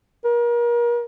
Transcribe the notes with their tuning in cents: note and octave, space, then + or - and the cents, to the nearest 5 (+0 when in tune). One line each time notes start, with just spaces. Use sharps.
A#4 +35